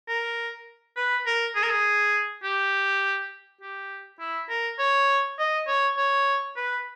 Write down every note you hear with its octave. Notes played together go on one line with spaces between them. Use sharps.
A#4
B4
A#4
G#4
A#4
G#4
G4
G4
E4
A#4
C#5
D#5
C#5
C#5
B4